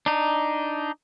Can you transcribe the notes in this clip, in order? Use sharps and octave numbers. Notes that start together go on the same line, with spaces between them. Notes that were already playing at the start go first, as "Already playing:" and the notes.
D4 D#4